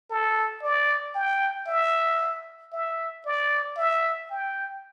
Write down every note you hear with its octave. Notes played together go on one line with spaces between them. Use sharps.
A4
D5
G5
E5
E5
D5
E5
G5